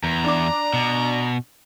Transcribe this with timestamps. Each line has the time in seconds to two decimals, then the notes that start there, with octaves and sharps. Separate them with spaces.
0.04 E2 A#5
0.24 D4 D6
0.73 B2